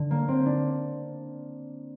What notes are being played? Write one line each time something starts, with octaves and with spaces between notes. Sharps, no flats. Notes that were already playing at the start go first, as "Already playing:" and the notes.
Already playing: D3
A#3
C4
D4